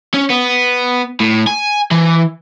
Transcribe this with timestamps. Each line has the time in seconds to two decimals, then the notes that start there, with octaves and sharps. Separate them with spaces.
0.14 C#4
0.30 B3
1.20 A2
1.47 G#5
1.91 E3